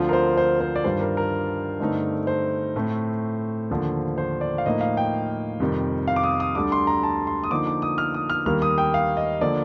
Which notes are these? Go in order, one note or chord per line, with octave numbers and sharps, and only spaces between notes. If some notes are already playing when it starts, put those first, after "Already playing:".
Already playing: D2 D3 F3 C4 F4 C5
A#4
C5
C5
C5
D5
G2 D#3 G3 D4 F4 C5
A#4
A#4
G2 D3 A3 C4 D#4
C5
A2 A3 C4
D#2 D3 F3
C5
D5
F5
A2 F3 A#3 D#4 D#5
F5
G5
F2 C3 D#3 G3
F5
D6
D#6
D#6
D2 D3 G3 D4 D6
C6
A#5
A5
C6
D#6
D3 F3 A#3 D#4 D6
D6
D#6
F6
D#6
F6
D#2 D#3 G3 A#3 F6
D#6
G5
F5
D#5
D3 F3 A#3 D5